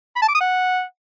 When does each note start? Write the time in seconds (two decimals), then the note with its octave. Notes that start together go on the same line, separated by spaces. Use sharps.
0.16 B5
0.22 A5
0.28 D6
0.35 D#6
0.41 F#5